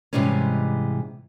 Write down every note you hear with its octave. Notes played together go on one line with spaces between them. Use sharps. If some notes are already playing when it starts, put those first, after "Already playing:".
G#2 C3 E3 G3 G#3 C#4